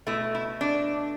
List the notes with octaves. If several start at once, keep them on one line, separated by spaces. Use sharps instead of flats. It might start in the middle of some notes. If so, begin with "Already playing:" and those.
B2 A3 E4
E4
D4